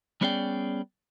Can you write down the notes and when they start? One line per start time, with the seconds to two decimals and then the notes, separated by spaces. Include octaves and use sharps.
0.21 G3 B3 C#4 G#4 D5 G5